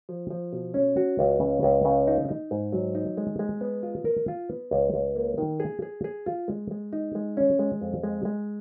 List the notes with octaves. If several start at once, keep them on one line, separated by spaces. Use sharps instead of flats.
F3
F3
B2
C#4
F#4
C#2
C#3
C#2
C#3
D#4
D#4
G#2
F#3
D#4
G#3
G#3
B3
F4
A#4
F4
B3
C#2
C#2
A#3
D#3
G#4
G#4
G#4
F4
G#3
G#3
D#4
G#3
C#4
G#3
F2
G#3
G#3